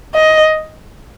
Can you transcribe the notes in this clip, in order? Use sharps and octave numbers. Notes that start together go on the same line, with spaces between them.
D#5